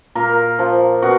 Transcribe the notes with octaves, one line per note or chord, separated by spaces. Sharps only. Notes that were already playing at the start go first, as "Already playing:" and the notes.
A#2 A#4
F3
B2 F#4